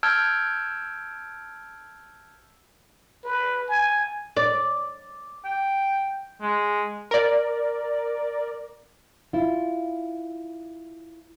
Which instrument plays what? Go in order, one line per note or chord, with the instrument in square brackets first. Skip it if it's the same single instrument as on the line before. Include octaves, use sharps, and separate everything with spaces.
[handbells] A5 E6 F6 G6 G#6 D7
[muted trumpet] B4
G#5
[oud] D5
[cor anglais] G5
G#3
[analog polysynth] A#4 D5
[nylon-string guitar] E4 F4